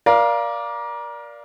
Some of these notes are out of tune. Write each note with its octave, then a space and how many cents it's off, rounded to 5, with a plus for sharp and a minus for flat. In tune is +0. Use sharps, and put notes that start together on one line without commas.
A#4 +25 D5 -5 F5 -10